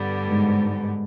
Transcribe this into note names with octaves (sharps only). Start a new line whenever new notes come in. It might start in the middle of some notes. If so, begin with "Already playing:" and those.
Already playing: G2 D3 G3 B3
G#2